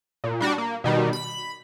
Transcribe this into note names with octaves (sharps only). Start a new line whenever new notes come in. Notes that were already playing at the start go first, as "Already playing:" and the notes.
A#2
G3 D4 F#4
A#3
B2 D#3 G3
B5